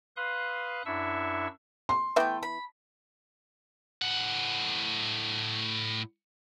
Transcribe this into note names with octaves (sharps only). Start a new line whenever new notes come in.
B4 F5 C6 D#6 F#6
F#2 D4 E4 E5 C#6 E6
C6
E3 A3 B3 E5 G5 G6
B5
A2 F#5